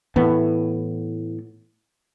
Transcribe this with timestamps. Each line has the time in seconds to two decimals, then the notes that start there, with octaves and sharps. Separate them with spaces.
0.16 A2 E3 B3